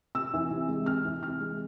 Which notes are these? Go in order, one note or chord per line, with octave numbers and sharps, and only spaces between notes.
C3 E6
E3
C3
G#3
C3 F6
E3
C3 F6
G#3